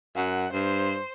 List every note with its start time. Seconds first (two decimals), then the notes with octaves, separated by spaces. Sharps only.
0.16 F#2 F#5
0.53 G2 C5